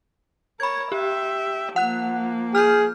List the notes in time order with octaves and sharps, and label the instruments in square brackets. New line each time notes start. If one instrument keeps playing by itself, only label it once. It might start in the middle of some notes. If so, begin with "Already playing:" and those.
[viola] A#4 C#5 [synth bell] B5 G#6
[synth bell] G4 [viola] E5 G5
[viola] F3 A#3 [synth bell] F#5 F#6
[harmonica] G#4 [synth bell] F6 G6